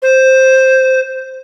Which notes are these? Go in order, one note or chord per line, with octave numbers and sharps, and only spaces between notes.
C5